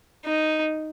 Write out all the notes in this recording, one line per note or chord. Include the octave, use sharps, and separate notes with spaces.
D#4